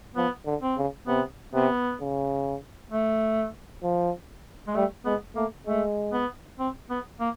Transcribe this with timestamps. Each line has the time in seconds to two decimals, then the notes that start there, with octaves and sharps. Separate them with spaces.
0.16 F3 B3
0.46 D3
0.62 C4
0.78 C#3
1.07 C3 B3
1.54 C3 B3
2.00 C#3
2.91 A3
3.83 F3
4.68 G#3
4.75 G3 A3
5.06 G#3 B3
5.36 A3 A#3
5.66 G#3 A3
6.13 B3
6.59 C4
6.90 B3
7.20 A#3